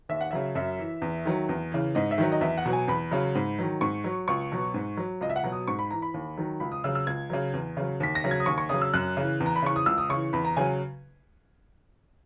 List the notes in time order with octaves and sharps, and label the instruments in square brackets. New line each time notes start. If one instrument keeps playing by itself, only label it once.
[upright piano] D#2 E5
F#5
C#3 F#3 E5
F#2 E5
E3
E2
D#3 F#3
E2
C#3 E3
G#2 D#5
E5
D#3 F#3
D#5
E2 E5
F#5
B2 F#3
G#5
E2 B5
C#3 F#3
G#2
D#3 F#3
G#2 C#6
F#3
C#2 C#6
B2 F#3
G#2
F#3
C#2 D#5
E5
F#5
B2 F#3
D#6
G#2 C#6
B5
E3 A#5
B5
D#2
D#3 F#3
C#2 B5
D#6
C#3 F#3 E6
E6
C#2 G#6
C#3 F#3
E2
C#3 F#3
D#2 B6
A#6
C#3 F#3
G#6
D#6
D#2 C#6
C#6
C#3 F#3 D#6
E6
F#2 F#6
C#3 E3
E2
A#5
B5
C#3 E3 C#6
D#6
C#2 E6
D#6
C#3 E3 C#6
E2 B5
A#5
C#3 F#3 G#5